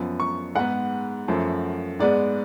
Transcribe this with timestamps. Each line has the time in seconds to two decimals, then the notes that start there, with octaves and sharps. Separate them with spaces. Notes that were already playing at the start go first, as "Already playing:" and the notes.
Already playing: F#2 F3 B3
0.20 C#6
0.55 G#2 G#3 B3 F#5
1.28 F#2 F3 A3
1.99 G#2 G#3 B3 D5